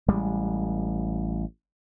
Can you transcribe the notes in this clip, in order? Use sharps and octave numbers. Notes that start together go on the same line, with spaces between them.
A1 G3 G#3